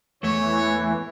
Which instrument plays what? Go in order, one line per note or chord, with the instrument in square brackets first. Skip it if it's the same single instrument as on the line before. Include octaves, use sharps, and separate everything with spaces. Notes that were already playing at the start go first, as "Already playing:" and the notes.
[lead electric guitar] E2 A3 [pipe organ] E3 [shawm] C#5